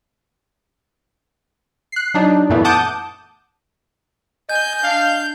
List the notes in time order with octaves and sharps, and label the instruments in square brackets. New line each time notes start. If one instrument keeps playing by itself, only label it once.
[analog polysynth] F#6 C7
F#3 D4 D#4
F#2 A#2 E3 A3 B3
F#5 A5 D6 D#6 G6
[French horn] D#5 [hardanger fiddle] G#5 [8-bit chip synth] G6
[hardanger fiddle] D4 [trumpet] F5